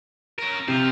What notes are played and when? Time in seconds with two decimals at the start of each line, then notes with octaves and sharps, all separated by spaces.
0.39 C#4 A#4
0.68 C3 C5 F5